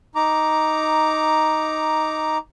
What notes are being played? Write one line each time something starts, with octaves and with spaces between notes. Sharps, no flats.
D#4 A#5 D6